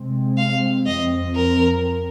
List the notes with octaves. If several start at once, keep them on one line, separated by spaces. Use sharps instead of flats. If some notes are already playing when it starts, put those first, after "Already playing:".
Already playing: C3 G#3 C4
F5
F2 F3 C4 D#5
A#4